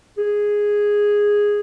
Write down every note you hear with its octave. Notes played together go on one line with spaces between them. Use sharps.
G#4